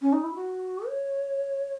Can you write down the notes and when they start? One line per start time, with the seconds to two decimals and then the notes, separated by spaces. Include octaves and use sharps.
0.02 C#4
0.13 D#4
0.24 E4
0.35 F#4
0.88 C#5